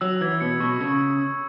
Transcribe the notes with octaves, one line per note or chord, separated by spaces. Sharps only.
F#3 E6
E3 G#6
B2 C#7
B2 C#6
C#3 E6